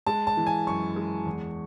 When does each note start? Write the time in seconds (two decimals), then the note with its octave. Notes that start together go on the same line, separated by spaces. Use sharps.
0.07 G#3 A5
0.27 A5
0.37 E3
0.46 G#5
0.67 F#2 C#6
0.96 G#3
1.26 E2